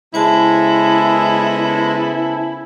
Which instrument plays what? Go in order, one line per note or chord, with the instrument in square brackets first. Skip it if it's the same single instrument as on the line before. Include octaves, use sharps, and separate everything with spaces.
[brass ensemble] C#3 B3 A4 [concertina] G#3 [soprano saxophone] E4 [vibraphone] C5 G#5 A5